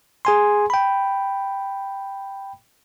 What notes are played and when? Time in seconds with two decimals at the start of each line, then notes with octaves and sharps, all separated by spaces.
0.25 G#4 G#5 C6
0.70 G5 B5